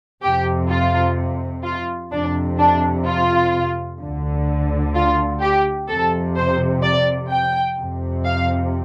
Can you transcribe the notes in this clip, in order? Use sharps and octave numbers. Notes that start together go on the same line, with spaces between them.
F2 C3 G4
F4
F4
F2 C3 D4
D4
F4
D2 D3
F4
G4
F2 C3 A4
C5
D5
G5
F2 C3
F5